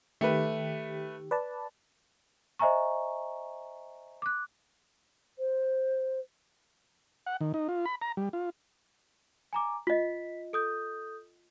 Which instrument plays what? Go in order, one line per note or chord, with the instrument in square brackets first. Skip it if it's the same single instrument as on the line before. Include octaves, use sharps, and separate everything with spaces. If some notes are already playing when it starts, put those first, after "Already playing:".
[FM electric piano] D#3 G4 [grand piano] A3 B4
[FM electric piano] B4 D5 A5
[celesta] C5 D#5 E5 G#5 A#5 C#6
D6 F#6
[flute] C5
[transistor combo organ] F#5
D#3
D#4
F4
B5
A#5
G3
F4
[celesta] G#5 A#5 D6
[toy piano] F4 D#5 [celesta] B6
[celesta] A4 D#6 G6